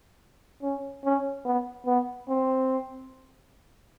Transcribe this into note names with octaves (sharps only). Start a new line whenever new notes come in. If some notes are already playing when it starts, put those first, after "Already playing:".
C#4
C#4
B3
B3
C4